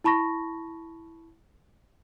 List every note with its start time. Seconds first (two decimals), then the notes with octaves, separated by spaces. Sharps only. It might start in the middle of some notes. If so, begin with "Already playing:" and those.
0.04 E4 A5 B5 C#6 A#6